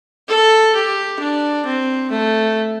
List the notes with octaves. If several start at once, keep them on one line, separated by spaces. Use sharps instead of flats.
A4
G4
D4
C4
A3